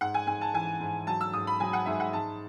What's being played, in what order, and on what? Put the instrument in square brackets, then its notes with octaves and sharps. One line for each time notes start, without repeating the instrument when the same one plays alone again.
[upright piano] G#2 F#5
G#5
G#2 G#5
A5
E3 G#5
G#2
F#3 A5
E6
G#2 D#6
B5
F#3 G#5
F#5
G#2 E5
F#5
G#2 A5